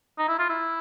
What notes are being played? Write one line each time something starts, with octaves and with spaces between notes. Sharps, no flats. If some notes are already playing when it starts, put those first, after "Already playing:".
D#4
E4
F4
E4